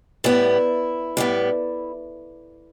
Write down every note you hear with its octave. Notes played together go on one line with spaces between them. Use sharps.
A2 G3 B3 E4
A2 G3 B3